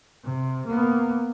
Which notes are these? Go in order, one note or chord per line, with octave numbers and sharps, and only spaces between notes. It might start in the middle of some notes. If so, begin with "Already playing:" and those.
C3
A#3 B3